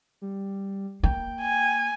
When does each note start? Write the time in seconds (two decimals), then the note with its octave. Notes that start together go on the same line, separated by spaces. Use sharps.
0.22 G3
1.03 A#3 G5
1.41 G#5